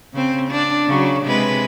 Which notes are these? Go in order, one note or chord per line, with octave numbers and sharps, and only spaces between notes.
C#3 C4
D4
C#3 F#3
C3 G#3 B4